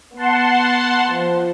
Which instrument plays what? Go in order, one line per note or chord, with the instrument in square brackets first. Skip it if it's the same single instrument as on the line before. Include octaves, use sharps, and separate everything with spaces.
[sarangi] B3 [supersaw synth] F#5 A5 C6
[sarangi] F3